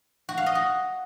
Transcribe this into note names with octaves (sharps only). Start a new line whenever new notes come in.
F#4
F5
D#5
F#4